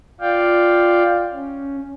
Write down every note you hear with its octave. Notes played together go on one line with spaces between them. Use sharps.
F4 D5 F5 G5
C#4